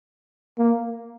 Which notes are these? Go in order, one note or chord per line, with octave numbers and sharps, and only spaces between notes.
A#3